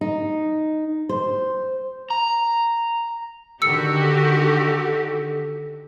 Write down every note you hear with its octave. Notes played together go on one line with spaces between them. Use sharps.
D#4
C5
A#5
D3 D#3 F#4 G4 A4 E6 C#7